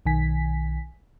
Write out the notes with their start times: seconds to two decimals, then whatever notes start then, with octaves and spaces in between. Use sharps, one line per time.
0.06 B1 D#3 G#5 B6